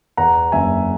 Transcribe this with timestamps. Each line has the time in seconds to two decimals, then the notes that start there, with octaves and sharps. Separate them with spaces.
0.17 E2 F#5 A#5
0.52 F#1 E5 G#5